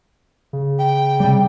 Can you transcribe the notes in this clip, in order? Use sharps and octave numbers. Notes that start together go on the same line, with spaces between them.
C#3
G5
C3 G3